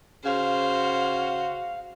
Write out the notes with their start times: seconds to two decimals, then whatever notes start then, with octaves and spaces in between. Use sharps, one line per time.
0.25 C#3 F#4 C5 F5